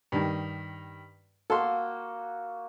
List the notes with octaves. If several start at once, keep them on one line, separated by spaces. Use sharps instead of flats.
G2 D#3
A#3 F#4 A4 C6